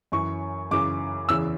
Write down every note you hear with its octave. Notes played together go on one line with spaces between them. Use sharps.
F#2 E3 C#6
F#2 C#3 E3 D6
E2 C#3 E3 E6